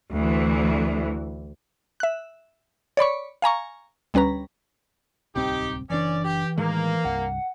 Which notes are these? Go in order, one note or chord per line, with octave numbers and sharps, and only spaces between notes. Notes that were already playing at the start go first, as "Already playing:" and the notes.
D2 E3
E5 F#6
C#5 D5 B5 C#6
F5 G#5 A#5 C#6
D2 G3 C#4 B4 A#5
D1 C2 C4 D#4 G4
F#1 E3 C#4 D4 D5
G4
A2 D#3 G#3 A#3
C2 G2 F#5